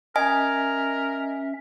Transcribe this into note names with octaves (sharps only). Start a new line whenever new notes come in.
C#4 A#4 D#5 E5 G#5